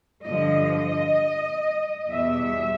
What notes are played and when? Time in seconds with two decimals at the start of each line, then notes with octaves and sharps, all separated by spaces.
0.24 G2 D3 F3 D#5
2.11 E2 B2 G3 E5